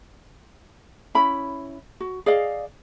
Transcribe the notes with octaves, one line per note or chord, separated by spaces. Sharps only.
C#4 E4 B5
F#4
G#4 D5 D#5 F5